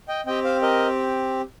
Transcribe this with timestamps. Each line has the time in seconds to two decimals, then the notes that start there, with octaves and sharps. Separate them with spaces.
0.08 D#5 G5
0.26 C4 G4 D#5 G5
0.44 C5 F5
0.62 A#4 D#5